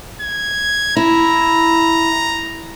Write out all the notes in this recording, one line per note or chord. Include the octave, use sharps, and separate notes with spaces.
G#6
E4 A#5